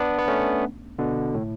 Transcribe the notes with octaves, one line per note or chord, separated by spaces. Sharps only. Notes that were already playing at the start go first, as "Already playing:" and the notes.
Already playing: B3 D4
B3
A3 C#4
B2 D3
A2